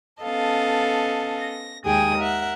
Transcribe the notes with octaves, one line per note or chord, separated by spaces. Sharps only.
B3 C#4 A4 D#5 F5 A5
A#6
D#2 G#3 G#4 G5 D#6
A#4 E5 F#5